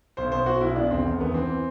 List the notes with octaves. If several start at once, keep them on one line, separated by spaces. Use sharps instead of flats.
B1 C5
B2 C5
B2 F#4
B1 E4
B2 D4
E1 C4
E2
E1 B3
E3 C4